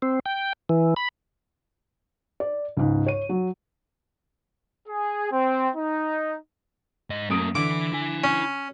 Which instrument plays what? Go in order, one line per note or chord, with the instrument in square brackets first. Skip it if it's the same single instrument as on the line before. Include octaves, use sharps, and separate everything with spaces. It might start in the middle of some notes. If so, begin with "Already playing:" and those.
[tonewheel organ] C4
G5
E3
B5
[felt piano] D5
C#2 G#2
C#5 D#7
F#3
[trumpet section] G#4
C4
D#4
[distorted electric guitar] G#2 D#5
[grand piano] F#2 D#6 D7 [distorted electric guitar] A3 A#3
[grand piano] D3 [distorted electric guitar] E3 [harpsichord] D6
[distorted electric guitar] E4 G#5
[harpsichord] C#4